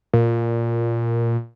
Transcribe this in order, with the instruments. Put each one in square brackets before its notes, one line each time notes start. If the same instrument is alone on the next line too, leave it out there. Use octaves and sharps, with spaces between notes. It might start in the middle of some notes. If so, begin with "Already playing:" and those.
[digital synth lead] A#2